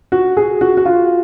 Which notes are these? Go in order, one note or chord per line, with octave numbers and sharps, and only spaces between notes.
F#4
G#4
F#4
F#4
F4